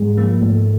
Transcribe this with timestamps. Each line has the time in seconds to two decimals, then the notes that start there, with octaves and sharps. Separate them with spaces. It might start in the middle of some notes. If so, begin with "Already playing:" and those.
Already playing: G#2 G#3
0.17 F3 A#3
0.41 G#2 A3